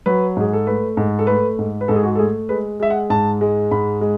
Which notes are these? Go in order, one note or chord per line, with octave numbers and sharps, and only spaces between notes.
F#3 B4
G#2 G#4
A4
A3 B4
G#2
A4
A3 B4
G#2
B4
G#2 A4
G#4
F#4
A4
A3 G#4
G#3 B4
G#3 E5
F#5
G#2 A5
G#3
G#2 B5
G#3